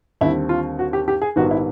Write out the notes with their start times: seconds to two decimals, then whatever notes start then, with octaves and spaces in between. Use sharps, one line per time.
0.21 D#2 D3 G3 C4 E4
0.49 F4
0.79 F#4
0.93 G4
1.08 G4
1.22 G#4
1.36 A#1 G#2 D#3 G3 B3 F#4
1.51 E4